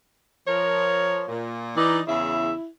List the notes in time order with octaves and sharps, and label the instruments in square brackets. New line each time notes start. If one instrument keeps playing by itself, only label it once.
[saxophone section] F3 A#4 [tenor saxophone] C#5
[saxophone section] A#2
[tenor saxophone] E3 [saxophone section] D#4 D5
[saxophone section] E2 C#3 E5 [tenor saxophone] E4